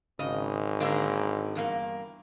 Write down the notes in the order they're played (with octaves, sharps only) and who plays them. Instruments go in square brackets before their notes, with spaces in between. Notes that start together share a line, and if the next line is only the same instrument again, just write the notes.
[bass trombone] G#1 [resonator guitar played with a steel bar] C#3 D#5
[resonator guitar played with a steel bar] D3 G#3 A#3
E2 G2 A#3